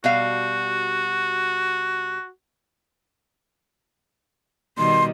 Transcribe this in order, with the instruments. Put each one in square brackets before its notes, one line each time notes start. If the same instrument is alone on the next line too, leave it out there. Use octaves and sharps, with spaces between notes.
[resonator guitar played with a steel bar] B2 G3 F5 [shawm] F#4
[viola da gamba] B2 D#3 G3 [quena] C6